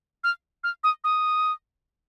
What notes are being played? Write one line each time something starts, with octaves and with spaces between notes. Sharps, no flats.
F6
F6
D#6
D#6